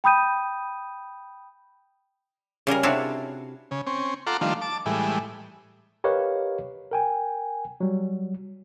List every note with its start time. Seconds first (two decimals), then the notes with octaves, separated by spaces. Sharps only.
0.04 G5 B5 D#6 G6 D#7
2.67 C#3 G3 G#4 A#4
2.83 C3 D4 E4 F#4 C#5 F5
3.71 C#3
3.87 C4 C#4
4.27 F4 A4 F#5 A#5 C6 D6
4.41 D#3 F3 G3 A3 D4 F4
4.62 A5 D6
4.86 A2 E3 G3 G#3
6.04 G4 A#4 B4 C#5 D#5 F5
6.91 A#4 G5 G#5
7.80 F#3 G3